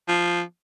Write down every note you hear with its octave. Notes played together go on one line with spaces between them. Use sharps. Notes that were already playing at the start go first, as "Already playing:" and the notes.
F3